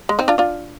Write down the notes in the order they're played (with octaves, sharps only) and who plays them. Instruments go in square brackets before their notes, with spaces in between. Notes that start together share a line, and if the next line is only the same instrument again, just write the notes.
[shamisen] G#3
C4 D#4
D4 F4
D4 F4